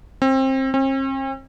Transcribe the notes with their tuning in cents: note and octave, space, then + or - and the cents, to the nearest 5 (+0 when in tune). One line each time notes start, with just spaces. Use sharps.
C4 +25
C4 +45